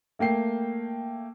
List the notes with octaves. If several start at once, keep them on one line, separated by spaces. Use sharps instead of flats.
A3 A#3 G5 C7